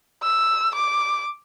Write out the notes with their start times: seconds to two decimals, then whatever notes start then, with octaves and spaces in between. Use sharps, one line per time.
0.23 E6
0.75 D6